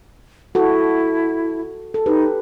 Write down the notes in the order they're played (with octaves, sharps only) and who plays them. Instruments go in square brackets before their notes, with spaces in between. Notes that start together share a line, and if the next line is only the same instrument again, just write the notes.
[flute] E4 [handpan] F#4 A4
[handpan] A4
[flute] D#4 [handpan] G4 B4